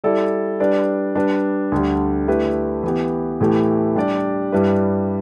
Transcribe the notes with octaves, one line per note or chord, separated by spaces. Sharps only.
G3 E4 A4 D5
G3 D4 B4 D5
G3 D4 B4 D5
D2 D3 G3
D3 A3 E4 G4 B4
E3 B3 G4
A2 E3 A3 G4
G3 D4 G4 D5
G2 G3 E4 B4